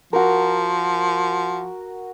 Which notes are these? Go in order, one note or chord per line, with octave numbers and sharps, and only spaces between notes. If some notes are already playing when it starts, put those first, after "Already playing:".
F3 F#4 A#4